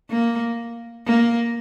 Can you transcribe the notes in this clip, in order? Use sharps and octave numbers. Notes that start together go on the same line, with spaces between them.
A#3
A#3